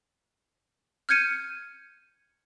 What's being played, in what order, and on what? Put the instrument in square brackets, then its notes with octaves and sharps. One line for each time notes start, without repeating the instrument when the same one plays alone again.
[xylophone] F6 G6 G#6 C#7 D#7